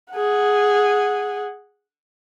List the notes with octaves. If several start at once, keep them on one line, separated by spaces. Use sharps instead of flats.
G#4 F#5